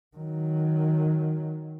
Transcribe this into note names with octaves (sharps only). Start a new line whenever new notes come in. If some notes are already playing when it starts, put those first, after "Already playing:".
D#3 F#3